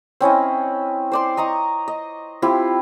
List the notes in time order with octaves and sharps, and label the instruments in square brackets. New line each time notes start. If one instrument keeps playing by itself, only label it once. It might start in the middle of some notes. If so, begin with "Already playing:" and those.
[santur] C4 C#4 E4 D#5
C5 D5 C6
D#5 A#5 C#6 D#6
D#5
C4 E4 F4 G4